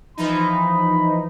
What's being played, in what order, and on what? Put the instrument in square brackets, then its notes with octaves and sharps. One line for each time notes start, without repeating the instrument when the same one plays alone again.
[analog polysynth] E3 F3 D#4 [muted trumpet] B5